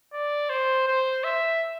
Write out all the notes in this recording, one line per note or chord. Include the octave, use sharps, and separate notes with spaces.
D5
C5
C5
E5